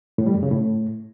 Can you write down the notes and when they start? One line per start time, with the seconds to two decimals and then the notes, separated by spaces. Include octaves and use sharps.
0.18 A2
0.26 G3
0.35 F#2
0.43 C#3
0.51 A2